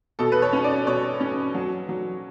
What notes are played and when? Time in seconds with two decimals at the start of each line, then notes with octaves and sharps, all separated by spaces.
0.19 B2 A4
0.32 B4
0.42 C#5
0.53 C#4
0.64 D5
0.86 B2 C#5
1.21 C#4
1.55 F#3
1.89 F#3